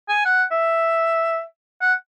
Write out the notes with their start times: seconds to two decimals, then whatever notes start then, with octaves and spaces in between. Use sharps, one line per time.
0.09 G#5
0.25 F#5
0.52 E5
1.81 F#5